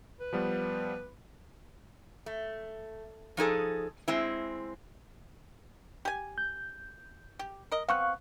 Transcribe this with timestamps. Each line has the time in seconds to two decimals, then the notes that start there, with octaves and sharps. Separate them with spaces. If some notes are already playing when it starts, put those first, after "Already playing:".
0.20 B4
0.33 F3 G3 B3
2.26 A3
3.37 F3 D#4 G#4 A4
4.08 G#3 C4 E4
6.05 G4 G#5
6.38 G6
7.39 G4
7.72 A#4 D#5
7.89 B3 C4 F5 C#6 F#6